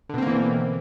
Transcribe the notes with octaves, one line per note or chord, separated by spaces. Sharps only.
B2 D3 E3 A#3 C4